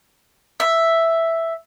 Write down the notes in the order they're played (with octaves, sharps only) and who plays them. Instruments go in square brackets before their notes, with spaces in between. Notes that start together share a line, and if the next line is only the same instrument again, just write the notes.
[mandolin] E5